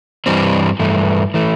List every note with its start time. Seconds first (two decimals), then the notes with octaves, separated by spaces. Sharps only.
0.26 G2 E3 G3 C4
0.80 G2 E3 A3
1.34 E3 A3